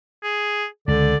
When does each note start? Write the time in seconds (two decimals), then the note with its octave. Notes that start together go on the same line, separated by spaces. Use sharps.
0.23 G#4
0.88 C#2 D3 D5